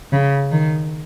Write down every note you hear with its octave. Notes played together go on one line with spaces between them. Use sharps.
C#3
D#3